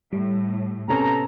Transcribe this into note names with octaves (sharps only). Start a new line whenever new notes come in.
A2 G3
C3 B3 C#4 A4 A#5